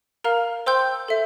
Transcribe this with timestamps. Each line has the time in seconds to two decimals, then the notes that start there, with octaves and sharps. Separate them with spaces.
0.24 A#4 F5 A#5 F6
0.66 C5 G5 C6 E6 G6
1.08 A4 E5